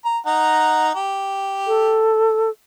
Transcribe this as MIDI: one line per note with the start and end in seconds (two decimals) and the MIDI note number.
0.05 0.18 82
0.26 0.95 63
0.26 0.95 78
0.26 0.95 82
0.95 2.16 67
1.67 2.50 69